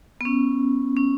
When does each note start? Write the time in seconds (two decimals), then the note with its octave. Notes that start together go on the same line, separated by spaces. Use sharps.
0.21 B3
0.25 C#4
0.97 C#4